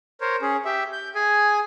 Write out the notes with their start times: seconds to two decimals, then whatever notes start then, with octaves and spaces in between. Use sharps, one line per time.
0.21 A#4 C5 C#5
0.42 C#4 G#4
0.65 G4 E5
0.92 G6
1.15 G#4 G#5